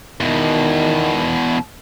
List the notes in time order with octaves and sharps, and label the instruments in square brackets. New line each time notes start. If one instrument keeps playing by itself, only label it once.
[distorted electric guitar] E2 B2 [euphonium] D#3